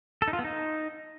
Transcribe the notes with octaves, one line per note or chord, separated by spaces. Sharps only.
A4
D#4
F4
B3
D#4